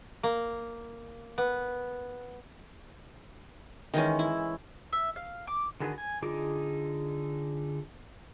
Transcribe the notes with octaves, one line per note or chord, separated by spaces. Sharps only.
A#3
B3
D#3 E3 G#3 C#4
E4
E5
F5
D6
D3 D#3 F#4 G#4 B4
G#5
D3 D#4 F4 G#4 D6